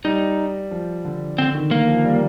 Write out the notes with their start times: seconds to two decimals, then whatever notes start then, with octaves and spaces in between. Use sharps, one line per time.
0.04 G3 D#4
0.71 F3
1.05 D3
1.38 D3 C4
1.55 D#3
1.71 D#3 A#3
1.88 F3
2.05 G3